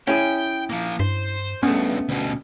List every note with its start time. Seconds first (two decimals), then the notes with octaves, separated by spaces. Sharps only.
0.08 C#4 E4 G#4 G5
0.70 F3 A#3
1.00 G2 C5
1.63 C#2 G2 A3 B3 C#4
2.09 D2 B2